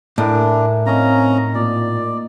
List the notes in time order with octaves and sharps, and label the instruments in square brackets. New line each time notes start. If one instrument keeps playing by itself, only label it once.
[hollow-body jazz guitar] A2 [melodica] D4 [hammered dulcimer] E4 A#4 G#5
[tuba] C4 [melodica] C#4 A#5 [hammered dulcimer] D#4 D#5 F5
[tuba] A#2 [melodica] D5